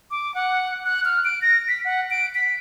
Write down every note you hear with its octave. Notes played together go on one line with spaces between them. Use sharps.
D6
F#5
F#6
F6
D7
A#6
B6
F#5
D7
B6